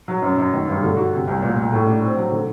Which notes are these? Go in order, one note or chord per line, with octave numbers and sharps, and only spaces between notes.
F#3
F#2
F#2
D#3
G2
D3
F#4
C3
C2
A#2
A#2
A2
D4
C4
F#3
D3